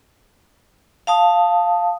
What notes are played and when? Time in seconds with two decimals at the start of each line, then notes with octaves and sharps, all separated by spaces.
1.07 F5 A5 D#6